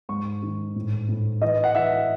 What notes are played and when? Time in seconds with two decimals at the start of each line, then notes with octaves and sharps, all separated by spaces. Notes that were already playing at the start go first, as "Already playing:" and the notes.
0.09 G#2 C#6
0.42 D#3
0.76 A2
1.09 A2
1.42 E3 D#5
1.64 F#5
1.75 E3 E5